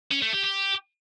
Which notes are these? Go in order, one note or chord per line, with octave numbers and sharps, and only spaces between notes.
C#4
A3
G4
G4